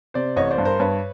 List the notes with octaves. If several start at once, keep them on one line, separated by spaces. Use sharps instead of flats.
C3 C5 D5
A1 C#5 D#5
C5 D5
G2
A#4 C5
G2 B4 C#5